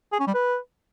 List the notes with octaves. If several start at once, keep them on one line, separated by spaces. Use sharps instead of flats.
G#4
C#4
G3
B4